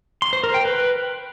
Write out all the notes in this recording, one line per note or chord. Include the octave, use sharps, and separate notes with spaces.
C6
C5
A#4
G5
B4